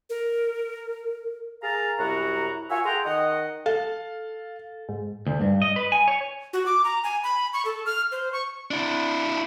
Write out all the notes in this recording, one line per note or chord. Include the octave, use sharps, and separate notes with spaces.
A#4
G#4 A#4 F5 A5 A#5
C2 F#2 E4 F#4 A#5
F4 F#4 A#4 C#5 E5 G#5
G#4 A4 F#5 G5 A#5 C6
D#3 D#5 F#5
A4 F5
G#2
D2
G2
D#5
B4
G#5
C#5
F#4
D6
A#5
G#5
B5
C#6
A4
F6
C5
C#6
D4 E4